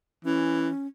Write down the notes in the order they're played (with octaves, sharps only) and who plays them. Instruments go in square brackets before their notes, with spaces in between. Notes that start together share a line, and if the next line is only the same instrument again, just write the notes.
[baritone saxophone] E3 [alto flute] C#4